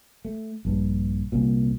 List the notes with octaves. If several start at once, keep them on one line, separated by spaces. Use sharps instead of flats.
A3
A#1 G2
C2 A#2